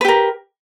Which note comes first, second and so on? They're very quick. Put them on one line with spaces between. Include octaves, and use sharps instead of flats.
B4 G4 A#4